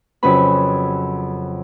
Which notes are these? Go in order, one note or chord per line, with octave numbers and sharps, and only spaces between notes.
F2 C#3 F#3 C#4 B4 B5